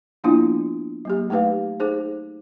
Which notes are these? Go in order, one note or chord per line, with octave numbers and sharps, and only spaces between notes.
F3 A#3 B3 D4 E4 F4
F#3 A#3 G4
A3 D#4 G4 B4 F5
D#4 G#4 C5